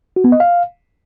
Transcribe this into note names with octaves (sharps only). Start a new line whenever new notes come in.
F#4
B3
D#5
F5